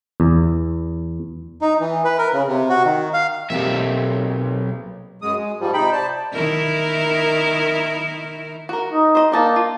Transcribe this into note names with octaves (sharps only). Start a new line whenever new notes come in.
E2
D#4
E3
B4
A#4
C#3
C3
F#4
D#3
F5
B1 A#3 C4 G4 E5
F#2 G#3 D#6
G#3
G#2 F3 G3
C3 D#4 G5 B5
C5 D5 A5
D#3 E4 A#4
F#4 A#4
D#4
C5 D#5
A#3 D4 D#4 A5
F4